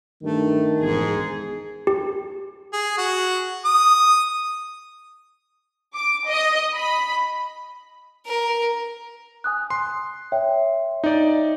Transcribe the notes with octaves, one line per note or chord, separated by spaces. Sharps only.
G2 D#3 A3
E1 G#2 G#4
G4
G#4
F#4
D#6
D6
D#5
B5
A#4
G#5 D#6 F#6
C6
C#5 E5 G5
D#4 D5